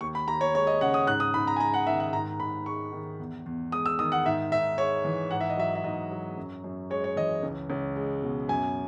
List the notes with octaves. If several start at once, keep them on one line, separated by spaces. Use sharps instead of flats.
D#2 C#6
B5
D#2 A#5
C#5
G#3 C#5
D#5
C#3 F#5
D#6
G#2 F#6
D#6
G#2 B5
A#5
G#5
G#3 A#5
F#5
D#3 E5
F#5
G#2 A#5
G#2 B5
G#3 C#6
D#3
E2
E2
G#3 D#6
E6
D#3 D#6
F#5
G#2 E5
G#2 E5
G#3 C#5
E3
G#2 F#5
E5
D#5
F#3 E5
E5
G#2 D#5
F#3
F#2
F#2
G#3 C#5
C#5
E3 D#5
C#2
C#2
G#3
B2
F#2 G#5